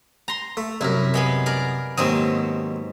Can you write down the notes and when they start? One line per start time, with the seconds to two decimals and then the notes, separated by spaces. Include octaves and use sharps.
0.28 A#5 C6
0.57 A3
0.81 C2 F#2 E4 A#4
1.14 G#3 B3 G#4
1.46 G#4 A#4 D5
1.97 D#2 G#2 B2 F#3 C4 D#6